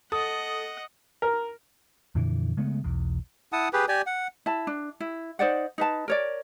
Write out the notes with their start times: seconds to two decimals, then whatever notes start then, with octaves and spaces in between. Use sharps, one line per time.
0.12 A4 D#5 F#5 D#6
1.22 A#4
2.15 F2 A#2 D3 E3
2.57 C#3 G#3 A3 B3
2.84 B1 E2
3.52 E4 F#5 A5 D#6
3.73 G4 G#4 B4
3.88 G4 D5 G#5
4.06 F#5
4.46 E4 A5
4.67 D4
5.00 E4
5.39 D#4 C5 D5 F#5
5.78 D#4 B4 A5
6.08 A#4 C#5 D5